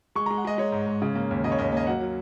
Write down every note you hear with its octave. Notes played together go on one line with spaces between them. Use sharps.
G#3 C#6
G#3 A#5
F#5
G#3 D#5
G#3 C#5
G#2
G#2
C#3
A#3
D#2
C#3 D#5
C#5
D#2 D#5
A#3 D#5
F#3 F#5
F#3